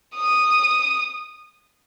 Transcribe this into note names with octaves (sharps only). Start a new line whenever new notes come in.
D#6